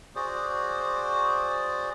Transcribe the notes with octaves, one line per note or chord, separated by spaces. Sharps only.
F#4 G#4 C5 D5